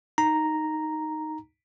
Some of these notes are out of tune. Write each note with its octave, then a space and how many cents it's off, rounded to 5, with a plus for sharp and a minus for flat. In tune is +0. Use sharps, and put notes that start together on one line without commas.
D#4 +0 A#5 +0